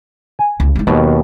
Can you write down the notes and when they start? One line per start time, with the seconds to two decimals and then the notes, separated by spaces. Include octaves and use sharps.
0.39 G#5
0.60 C#2
0.75 G#3 D#4
0.87 D#2 B2 F#3